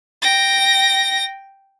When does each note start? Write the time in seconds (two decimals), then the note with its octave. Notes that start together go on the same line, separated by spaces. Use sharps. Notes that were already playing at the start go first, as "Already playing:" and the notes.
0.22 G5 A#6